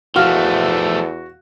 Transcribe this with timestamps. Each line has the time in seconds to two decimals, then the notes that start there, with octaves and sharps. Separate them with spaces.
0.16 E2 F3 A3 F#4 F5 F6